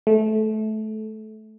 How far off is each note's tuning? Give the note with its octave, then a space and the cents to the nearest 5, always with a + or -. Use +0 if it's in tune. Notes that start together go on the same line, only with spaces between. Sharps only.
A3 -20